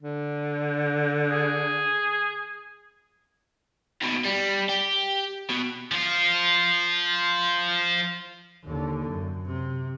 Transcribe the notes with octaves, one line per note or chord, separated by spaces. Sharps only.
D3
G#4
D#2 B2
G3
G4
B2
F3 F4
D#2 D3
F#2
C3